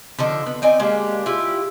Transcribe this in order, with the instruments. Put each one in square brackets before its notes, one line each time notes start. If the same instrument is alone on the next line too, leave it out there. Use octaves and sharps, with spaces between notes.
[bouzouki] D3 F3 D#4 A4
B3
C4 D#4 D5 G#5
G#3 A#3 D4 G4
E4 F4 G4